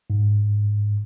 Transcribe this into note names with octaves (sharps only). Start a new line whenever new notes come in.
G#2